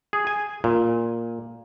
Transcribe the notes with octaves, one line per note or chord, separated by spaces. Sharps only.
G#4
G#5
A#2